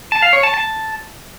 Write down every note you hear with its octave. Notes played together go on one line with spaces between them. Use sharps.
A5
F5
C#5
A5
A5